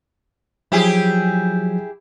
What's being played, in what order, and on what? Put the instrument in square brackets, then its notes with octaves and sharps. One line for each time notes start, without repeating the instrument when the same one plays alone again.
[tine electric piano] F3 F#3 [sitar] E4 G4 G#4